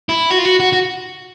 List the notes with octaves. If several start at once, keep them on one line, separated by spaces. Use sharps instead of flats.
E4
F#4
F4
F#4
F#4
F#4